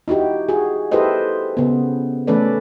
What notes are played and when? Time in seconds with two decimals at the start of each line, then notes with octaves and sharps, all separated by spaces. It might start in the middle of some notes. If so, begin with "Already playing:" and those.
0.08 D#4 E4 F#4 G4
0.49 F#4 G#4
0.92 E4 G4 A4 B4 C5 D#5
1.57 C#3 B3
2.27 E3 A3 C#4 A4 B4 D5